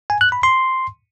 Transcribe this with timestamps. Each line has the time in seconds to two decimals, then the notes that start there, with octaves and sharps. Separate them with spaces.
0.10 G#5
0.21 F#6
0.32 B5
0.43 C6